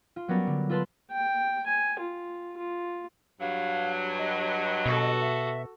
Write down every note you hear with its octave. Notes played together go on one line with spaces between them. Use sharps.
F4
F#3 G3 B3 C#4 A#4 D5
D3
F4 A4 B4 A5 C6
G5
G#5
F4
F4
G2 F#3 F5
D#5
B2 F#4 A4
E5